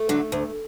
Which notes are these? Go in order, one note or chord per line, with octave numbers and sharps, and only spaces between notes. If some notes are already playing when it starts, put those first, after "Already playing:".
Already playing: A3
D3 F#3
D2